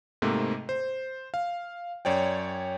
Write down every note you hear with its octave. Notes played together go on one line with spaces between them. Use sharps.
G#2 C3 A3 A#3
C5
F5
F#2 C#5 D5 G5